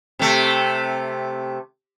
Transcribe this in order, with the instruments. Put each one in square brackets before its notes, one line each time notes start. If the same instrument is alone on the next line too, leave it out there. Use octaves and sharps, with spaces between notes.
[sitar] C3 A3